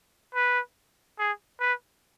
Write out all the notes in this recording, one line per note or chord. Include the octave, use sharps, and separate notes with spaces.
B4
G#4
B4